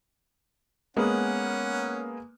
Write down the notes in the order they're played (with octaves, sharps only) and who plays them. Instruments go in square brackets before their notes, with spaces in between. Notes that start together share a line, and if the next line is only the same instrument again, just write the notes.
[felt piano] G#3 A#3 B3 [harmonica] C#4 F#5